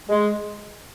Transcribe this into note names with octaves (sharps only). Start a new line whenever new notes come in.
G#3